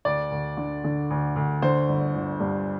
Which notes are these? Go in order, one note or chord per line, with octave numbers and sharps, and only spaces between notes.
D2 D5
D2
D3
D3
D2
D2
D3 C5
G1
G1
G2